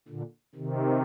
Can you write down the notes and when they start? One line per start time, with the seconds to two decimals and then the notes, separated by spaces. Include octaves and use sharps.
0.08 A#2 D3
0.55 C3 D#3